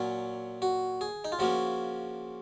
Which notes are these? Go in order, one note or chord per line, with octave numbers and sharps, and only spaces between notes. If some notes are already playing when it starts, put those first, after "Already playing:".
Already playing: A#2 F#3 C#4
F#4
G#4
D#4
F4
C#3 F3 A#3 C#4 F#4